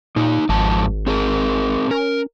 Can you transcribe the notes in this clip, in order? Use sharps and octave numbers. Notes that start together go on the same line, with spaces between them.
A#2 A#3 D#4
G#1 F2 G#2 A5
C4 G#4 A#4
C#4 A#4